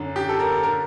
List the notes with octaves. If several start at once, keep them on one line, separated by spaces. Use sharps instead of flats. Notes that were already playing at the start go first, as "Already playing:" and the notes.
Already playing: F#2 D3
G4
A4
A#4
A#4
D3